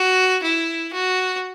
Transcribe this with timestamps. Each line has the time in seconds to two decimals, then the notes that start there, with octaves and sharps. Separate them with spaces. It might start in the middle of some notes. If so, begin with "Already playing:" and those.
Already playing: F#4
0.43 E4
0.93 F#4